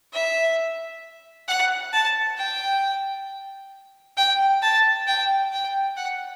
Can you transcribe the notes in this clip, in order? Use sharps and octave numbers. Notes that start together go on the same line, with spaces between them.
E5
F#5
A5
G5
G5
A5
G5
G5
F#5